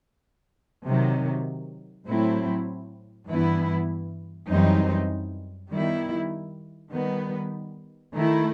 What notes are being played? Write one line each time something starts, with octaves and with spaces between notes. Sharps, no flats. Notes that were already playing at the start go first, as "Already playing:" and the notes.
C3 D#3 F#3
A2 F#3 A3 C4 E4
G2 E3 B3 E4
F#2 E3 G3 C4 D#4
D#3 G3 B3 E4
D#3 G3 B3
D#3 A3 E4